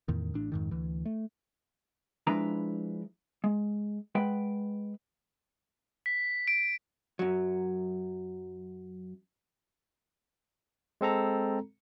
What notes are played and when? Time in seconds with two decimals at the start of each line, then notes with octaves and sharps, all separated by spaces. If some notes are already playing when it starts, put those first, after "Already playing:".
0.08 E2 A2 D#3
0.34 A1 A2 D4
0.52 F2 G#2 D#3
0.71 D2 E3
1.06 A3
2.27 F3 G#3 D4 E4 B4 A#5
3.44 G#3
4.15 G#3 B4 F#5 G5
6.06 B6
6.47 D7
7.19 F#2 F#3
11.01 G#3 C4 A4 A#5